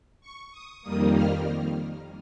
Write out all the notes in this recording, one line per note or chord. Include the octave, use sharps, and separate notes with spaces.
C#6
D#6
F2 D#3 G3 A#3 D#6
F6